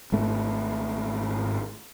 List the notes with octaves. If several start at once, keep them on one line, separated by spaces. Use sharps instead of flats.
G#1 G#2 A3